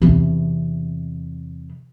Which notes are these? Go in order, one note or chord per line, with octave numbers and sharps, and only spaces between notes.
E2 C3